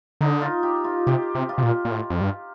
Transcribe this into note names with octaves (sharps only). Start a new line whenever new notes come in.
D3 D#4
F4
G4
F4
C3 G4
C3
F4
C3
A#2
A#2
A2
F2
G2